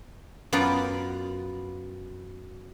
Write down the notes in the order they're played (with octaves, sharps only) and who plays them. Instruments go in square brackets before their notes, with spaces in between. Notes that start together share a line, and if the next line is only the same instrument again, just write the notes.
[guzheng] F#2 B3 F4 B4 D5 A#5